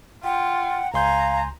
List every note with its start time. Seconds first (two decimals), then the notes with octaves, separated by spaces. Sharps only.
0.24 F4 F#5 G5
0.94 C#2 F5 G#5 A#5 C6 G6